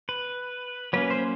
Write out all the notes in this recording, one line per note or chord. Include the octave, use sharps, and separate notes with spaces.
B4
F#3 A#3 C#4 B4
C5